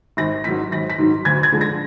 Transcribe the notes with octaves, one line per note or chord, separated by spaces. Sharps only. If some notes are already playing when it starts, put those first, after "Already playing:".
G#1 A#6
G#2 D#3 F#3 B6
G#1 A#6
B6
G#2 D#3 F#3
D2 G#6
G#6
D3 F3 G#3
A#6